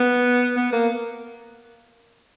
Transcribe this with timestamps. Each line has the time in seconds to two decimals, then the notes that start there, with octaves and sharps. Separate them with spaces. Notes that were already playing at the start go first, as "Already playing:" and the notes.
Already playing: B3
0.56 B3
0.72 A#3